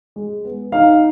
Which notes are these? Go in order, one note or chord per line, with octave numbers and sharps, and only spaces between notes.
G#3
B3
D#4 F5